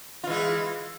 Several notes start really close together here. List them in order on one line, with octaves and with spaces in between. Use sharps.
F4 E3 G#3